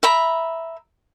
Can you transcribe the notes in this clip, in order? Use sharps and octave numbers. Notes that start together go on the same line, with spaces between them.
E5 A#5 B5